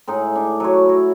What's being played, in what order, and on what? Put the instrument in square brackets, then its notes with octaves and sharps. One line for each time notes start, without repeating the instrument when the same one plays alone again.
[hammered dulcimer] A2 G#3 D#4
D4
F#3 C#5
E4 F#4